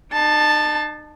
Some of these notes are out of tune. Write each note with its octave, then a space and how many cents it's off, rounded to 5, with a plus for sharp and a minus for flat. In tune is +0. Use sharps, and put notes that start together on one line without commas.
D#4 -40 A5 +0